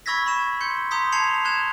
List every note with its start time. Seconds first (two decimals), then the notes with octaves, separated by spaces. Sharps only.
0.06 B5 C#6 E6 G#6 A#6 B6
0.26 B5 C#6 E7
0.61 C6 G6 C#7
0.91 A#5 C6 D#6 G6 B6
1.12 A5 C6 G#6 C7 C#7 F7
1.45 C6 F#6 G#6 E7